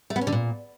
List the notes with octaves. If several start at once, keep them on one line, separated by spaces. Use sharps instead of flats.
A3
B3
C#4
D3
A#2